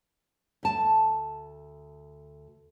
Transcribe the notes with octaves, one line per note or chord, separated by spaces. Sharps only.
D2 A5